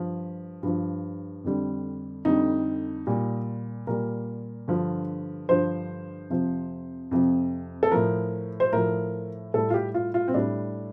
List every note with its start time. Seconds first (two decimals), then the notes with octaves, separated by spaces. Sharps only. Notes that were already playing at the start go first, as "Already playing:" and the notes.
Already playing: G2 F3
0.63 G2 F3
1.44 F2 D3 G3
2.25 F2 D3 G3 D#4
3.07 A#2 G3
3.87 A#2 G3 A#4
4.68 G2 D3 F3
5.49 G2 D3 F3 C5
6.30 F2 C3 F3
7.11 F2 C3 F3
7.83 A4
7.91 A2 F3 A#4
8.60 C5
8.73 A2 F3 A#4
9.54 A2 G3 A4
9.70 F4
9.74 G4
9.94 F4
10.14 F4
10.28 C4
10.34 A2 G3 D4